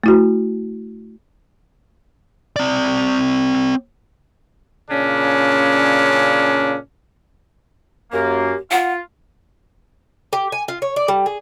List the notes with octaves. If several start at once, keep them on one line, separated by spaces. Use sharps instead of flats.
A3 E4 F#4
C4 D5
A#2 C#3 C#4 D4
F#2 A#3 G4
F4 F#5
G4
G#5
F4
C#5
D5
G3
G#4